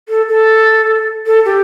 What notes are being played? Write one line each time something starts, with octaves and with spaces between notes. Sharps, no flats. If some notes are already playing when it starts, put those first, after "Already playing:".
A4
A4
A4
G4